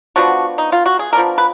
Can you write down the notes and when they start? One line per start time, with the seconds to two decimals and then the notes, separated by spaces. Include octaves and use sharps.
0.16 F3 B3 D4 F#4
0.58 D#4
0.72 F4
0.86 F#4
0.99 G#4
1.13 F3 B3 D4 A#4
1.38 B4